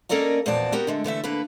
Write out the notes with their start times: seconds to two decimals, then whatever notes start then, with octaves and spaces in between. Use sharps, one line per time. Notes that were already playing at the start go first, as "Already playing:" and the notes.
0.09 A#3 C#4 A4 A#4 D5 D#5
0.46 E2 A#2 F3 F#4 D5 A5
0.72 B3 F#4 G4 A#4
0.87 D3 G#3 A3
1.04 D3 E3 A3 E5
1.24 D3 A#3 B4